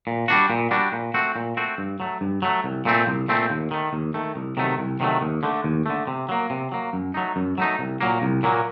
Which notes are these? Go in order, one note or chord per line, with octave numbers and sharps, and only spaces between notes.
A#2
G3 D4 F#4
A#2
G3 D4 F#4
A#2
A3 C4 F#4
A#2
A3 C4 F#4
G2
F#3 A3
G2
F#3 A3
C2
A#2 A3 C4
C2
A#2 A3 C4
D#2
D#3 A3
D#2
D#3 A3
C2
C3 D#3 F#3 A3
C2
C3 D#3 F#3 A3
D#2
D3 A3
D#2
D3 A3
C3
F#3 A#3
C3
F#3 A#3
F#2
F#3 A3 D#4
F#2
F#3 A3 D#4
C2
A#2 F#3 A#3
C2
A#2 F#3 A#3